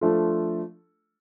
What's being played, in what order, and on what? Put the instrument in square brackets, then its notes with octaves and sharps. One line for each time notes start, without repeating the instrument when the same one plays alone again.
[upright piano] F3 A3 D4 F4 A4